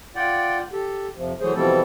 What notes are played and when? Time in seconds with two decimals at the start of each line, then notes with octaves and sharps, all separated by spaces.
0.16 F4 D5 F#5 G5
0.72 G4 A4
1.16 F2 C3 F3
1.40 E3 F#3 A3 G#4 C5
1.54 B2 E3 F3 G3 C4 A4